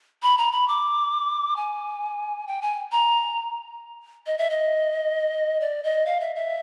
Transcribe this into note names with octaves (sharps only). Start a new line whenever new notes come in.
B5
A#5
B5
D6
G#5
G5
G#5
A#5
D#5
E5
D#5
D5
D#5
F5
E5
E5